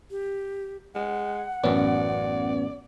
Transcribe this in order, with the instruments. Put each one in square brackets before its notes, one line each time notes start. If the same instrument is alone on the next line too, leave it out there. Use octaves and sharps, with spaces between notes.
[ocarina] G4
[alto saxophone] G#3 [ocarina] F#5
[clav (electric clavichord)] A1 F#2 [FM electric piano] B3 C#4 [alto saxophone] D5